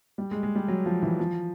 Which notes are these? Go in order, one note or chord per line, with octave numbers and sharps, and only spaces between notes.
G3
G#3
G#3
G3
F#3
F3
E3
F3